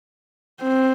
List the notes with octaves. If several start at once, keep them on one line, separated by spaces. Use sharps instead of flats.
C4